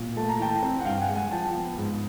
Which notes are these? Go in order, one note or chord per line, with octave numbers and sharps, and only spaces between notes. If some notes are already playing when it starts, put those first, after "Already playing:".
Already playing: A#2
A3 A5
A#5
E3 G5 A5
C4
F#5
G2 F5 G5
F#5 G#5
G#3
F#5 G#5
F3 G5 A5
B3
G#2